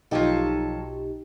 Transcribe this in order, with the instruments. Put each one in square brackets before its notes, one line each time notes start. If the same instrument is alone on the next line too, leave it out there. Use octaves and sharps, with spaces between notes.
[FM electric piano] B1 D#4 G4 [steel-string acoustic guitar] F3 F#3 A4